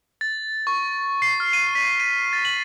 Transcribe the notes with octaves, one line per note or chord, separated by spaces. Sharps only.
A6
C#6
C7
F6
D#7
B6
D#7
A6
F#7